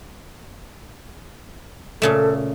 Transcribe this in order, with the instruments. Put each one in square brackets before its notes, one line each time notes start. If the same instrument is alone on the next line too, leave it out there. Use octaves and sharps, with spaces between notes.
[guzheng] A#2 C#3 A3 [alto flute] A4